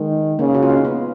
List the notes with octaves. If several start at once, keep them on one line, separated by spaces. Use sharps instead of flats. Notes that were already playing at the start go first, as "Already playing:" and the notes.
Already playing: D#3 G#3
C#3 A#3
F#4
F4
D#4
C#4
B3